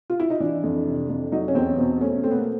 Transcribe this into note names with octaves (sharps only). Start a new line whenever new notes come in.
F4
E4
D#4
E3 D4
F2
C3
F2
F#3 D#4
C#4
E2 C4
B2 C4
A3 C#4
A3 C4
B3
A#3